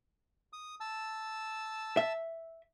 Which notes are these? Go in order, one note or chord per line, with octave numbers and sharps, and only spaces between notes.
D#6
A5 E6
E5